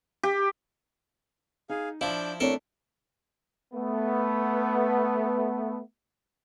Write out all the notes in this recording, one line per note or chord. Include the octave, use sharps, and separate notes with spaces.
G4
D#4 G#4 F5
F3 D4 E4 F5 D6 G6
A3 C4 D4 E4 A4 A#4 C#5
A3 B3